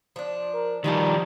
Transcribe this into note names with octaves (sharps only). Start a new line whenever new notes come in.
F3 D4
A#4
D#3 F3 G3 A#3 D#4 A5